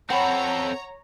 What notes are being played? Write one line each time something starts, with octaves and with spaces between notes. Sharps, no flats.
C4 A4 C#5 F#5 A#5 B5